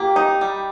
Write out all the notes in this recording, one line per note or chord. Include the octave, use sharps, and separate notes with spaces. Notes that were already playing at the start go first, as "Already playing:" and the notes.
Already playing: A#3 G4
D#4
G3